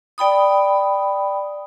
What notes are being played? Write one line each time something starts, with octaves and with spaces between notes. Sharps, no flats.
D5 G5 B5 D#6